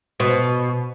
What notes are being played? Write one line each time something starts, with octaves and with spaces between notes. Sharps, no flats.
B2